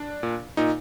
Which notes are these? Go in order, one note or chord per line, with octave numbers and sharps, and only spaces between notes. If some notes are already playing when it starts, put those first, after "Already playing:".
Already playing: D4
A#2
A#2 D#4